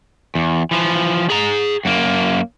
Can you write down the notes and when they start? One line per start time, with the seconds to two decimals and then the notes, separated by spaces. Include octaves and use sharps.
0.35 E2
0.71 E3 F3
1.30 G#4 A#5
1.85 F#2 A#3